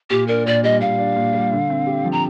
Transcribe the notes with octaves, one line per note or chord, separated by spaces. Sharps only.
A#2 G4
D4 A#4
A#2 D5
G3 D#5
A#2 F5
D4
A#2
G3
D3
C4
G4
F3
A#5